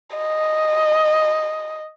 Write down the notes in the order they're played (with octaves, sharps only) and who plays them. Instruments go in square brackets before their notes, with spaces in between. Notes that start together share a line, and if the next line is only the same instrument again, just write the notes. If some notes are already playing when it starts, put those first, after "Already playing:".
[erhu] D#5